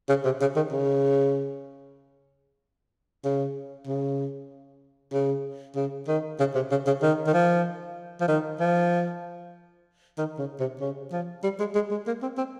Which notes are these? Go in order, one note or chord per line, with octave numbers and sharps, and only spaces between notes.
C#3
C3
C#3
D#3
C#3
C#3
C#3
C#3
C#3
D#3
C#3
C3
C#3
C#3
D#3
D#3
F3
F3
D#3
F3
D#3
C#3
C3
C#3
F3
G3
G#3
G#3
G#3
A#3
C4
C4